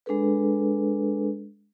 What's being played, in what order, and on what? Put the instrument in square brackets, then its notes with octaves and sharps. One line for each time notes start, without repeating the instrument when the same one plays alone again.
[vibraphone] G#3 D4 G#4 A4 B4